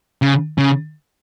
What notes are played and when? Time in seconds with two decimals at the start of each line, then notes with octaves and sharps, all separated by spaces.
0.22 C#3
0.58 C#3